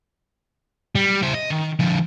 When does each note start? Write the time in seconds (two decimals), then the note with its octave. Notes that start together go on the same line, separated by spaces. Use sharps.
0.95 G3
1.22 E4 C5
1.34 D#5
1.51 D#3
1.80 D3 F3